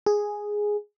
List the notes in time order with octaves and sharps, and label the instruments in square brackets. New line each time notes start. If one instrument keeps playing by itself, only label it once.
[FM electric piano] G#4